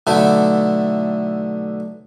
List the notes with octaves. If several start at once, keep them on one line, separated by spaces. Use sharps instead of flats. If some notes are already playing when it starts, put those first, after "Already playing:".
B1 D3 A3 E4